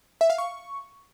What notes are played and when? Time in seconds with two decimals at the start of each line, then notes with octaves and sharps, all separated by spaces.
0.21 E5
0.30 F5
0.38 C#6